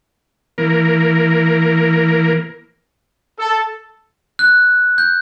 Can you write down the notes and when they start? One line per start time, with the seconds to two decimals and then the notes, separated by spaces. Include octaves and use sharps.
0.58 E3 A#3 A#4
3.39 A4
4.39 F#6
4.98 G6